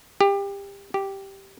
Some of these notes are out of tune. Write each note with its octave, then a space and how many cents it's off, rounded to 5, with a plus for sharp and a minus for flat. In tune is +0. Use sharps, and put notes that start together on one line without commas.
G4 +25
G4 -5